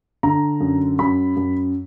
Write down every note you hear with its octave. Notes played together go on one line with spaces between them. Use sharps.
D3 A#5
F#2
F#2 B5
F#2